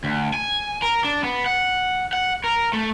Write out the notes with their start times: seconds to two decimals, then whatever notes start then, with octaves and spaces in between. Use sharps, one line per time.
0.04 D2
0.34 G#5
0.82 A#4
1.04 D4
1.23 B3
1.46 F#5
2.13 F#5
2.44 A#4
2.73 A3